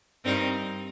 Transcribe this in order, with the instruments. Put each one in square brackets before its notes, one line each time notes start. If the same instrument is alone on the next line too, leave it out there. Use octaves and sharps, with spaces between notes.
[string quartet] G2 G3 C4 D#4 A#4